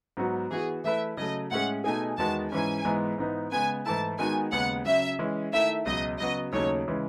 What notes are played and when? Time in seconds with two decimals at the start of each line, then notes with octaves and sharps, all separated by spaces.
0.17 G#2 F#3 B3 F#4
0.50 E3 B3 F#4 G#4
0.84 E3 A3 E4 B4 E5
1.17 C#3 F#3 A3 D#5
1.51 A2 G#3 C#4 G#4 F#5
1.84 B2 A3 D#4 G#4 G#5
2.18 E2 D#3 G#3 B3 F#4 A5
2.52 G#2 E3 G#3 C#4 G#5
2.85 G#2 E3 G#3 B3
3.18 G#2 E3 B3 D#4
3.52 C#3 G#3 B3 G#5
3.85 G#2 E3 A3 E4 A5
4.18 D#3 G#3 B3 D#4 F#4 G#5
4.52 D#2 C#3 G#3 B3 F#5
4.85 C#3 F#3 C#4 E5
5.19 E3 G#3 C#4
5.53 D#3 A3 E4 E5
5.85 C#2 B2 F#3 D#5
6.19 C#3 F#3 B3 F#4 D#5
6.52 D#2 C#3 F#3 A3 D#4 C#5
6.88 C#3 E3 G#3